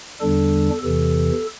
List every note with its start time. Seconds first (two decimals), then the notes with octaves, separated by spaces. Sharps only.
0.20 E2 D3 G3 D4 A4
0.82 E2 C3 E3 A4